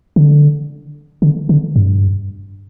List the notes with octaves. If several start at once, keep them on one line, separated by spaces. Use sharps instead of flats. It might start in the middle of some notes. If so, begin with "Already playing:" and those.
D3
D3
D3
G2